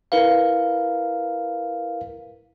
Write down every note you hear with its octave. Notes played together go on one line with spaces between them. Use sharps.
E4 A#4 B4 F5